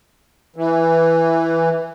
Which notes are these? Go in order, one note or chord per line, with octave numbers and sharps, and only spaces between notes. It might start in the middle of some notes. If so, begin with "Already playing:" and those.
E3